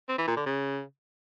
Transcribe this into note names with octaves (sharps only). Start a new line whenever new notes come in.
C4
E3
A#2
D3
C#3